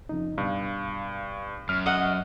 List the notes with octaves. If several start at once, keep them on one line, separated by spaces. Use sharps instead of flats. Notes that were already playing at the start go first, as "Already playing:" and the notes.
F2 C#3 D#4
G2 B2 F5
F#2 F6
D#5 F#5